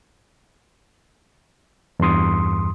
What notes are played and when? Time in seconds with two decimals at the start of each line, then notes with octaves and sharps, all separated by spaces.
2.00 E2 G2 C6 D#6